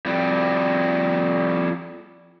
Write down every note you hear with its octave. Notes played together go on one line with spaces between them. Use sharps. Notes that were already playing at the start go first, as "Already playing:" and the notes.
F2 G3